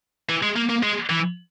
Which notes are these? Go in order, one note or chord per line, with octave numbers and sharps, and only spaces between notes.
E3
G#3
A#3
A#3
G#3
E3